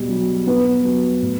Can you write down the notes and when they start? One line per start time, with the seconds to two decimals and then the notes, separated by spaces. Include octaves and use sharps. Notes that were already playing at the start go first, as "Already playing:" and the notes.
Already playing: B2 G3 G4
0.09 F#3
0.47 B2 B3 B4
0.85 F#3
1.22 A2